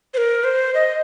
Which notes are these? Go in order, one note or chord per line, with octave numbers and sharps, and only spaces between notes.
C5
A#4
C5
D#5